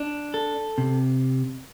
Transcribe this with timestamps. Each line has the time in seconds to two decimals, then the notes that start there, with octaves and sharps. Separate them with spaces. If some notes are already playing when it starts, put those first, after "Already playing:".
Already playing: D4
0.34 A4
0.78 C3